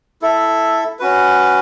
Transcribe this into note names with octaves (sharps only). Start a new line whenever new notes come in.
E4 A4 E5
C#4 F#4 B4